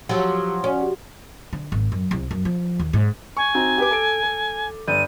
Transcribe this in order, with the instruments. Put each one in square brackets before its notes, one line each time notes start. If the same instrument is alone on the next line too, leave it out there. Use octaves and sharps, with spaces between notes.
[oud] F3 F#3 [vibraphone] G4 E6
[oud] C#4 [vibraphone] F#4 D5 F#5
[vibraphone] F#4 G4
[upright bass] D3
G#1
F#2
C2
F#2
F3
D#2
G#2
[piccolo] G#5 [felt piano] C#6
[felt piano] C4 D#4 F#4
G4 B4 D6
A4 D7
A4
[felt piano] G1 D5 G6 [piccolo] D#7